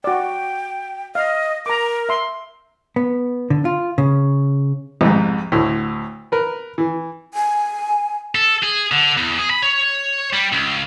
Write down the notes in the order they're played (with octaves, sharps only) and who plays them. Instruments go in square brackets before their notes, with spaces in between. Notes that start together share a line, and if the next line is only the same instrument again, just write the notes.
[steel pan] F#4 D5 [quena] G5
[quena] D#5 [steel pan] F5
[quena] A#4 [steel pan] A#5 D6
[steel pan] E5 C6
[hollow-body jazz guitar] B3
D3
F4
C#3
[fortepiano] C2 F2 G#2
D2 A2
A#4 B4
E3
[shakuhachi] G#5
[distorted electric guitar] A4
G#4
D3
E2
G#4
B5
C#5
G3
C#2